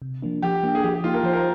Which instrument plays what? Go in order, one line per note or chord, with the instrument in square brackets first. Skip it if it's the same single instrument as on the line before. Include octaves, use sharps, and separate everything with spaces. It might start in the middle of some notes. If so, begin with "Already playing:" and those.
[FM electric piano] C3
F3 A#3 D4
[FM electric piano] F3 [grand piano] G4
[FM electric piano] A#3 D4
[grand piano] G#4
[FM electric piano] F3 [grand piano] G4
[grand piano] G4
[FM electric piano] A#3 D#4 [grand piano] F4
[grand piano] A#4
[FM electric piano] F3 [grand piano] C5
[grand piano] A#4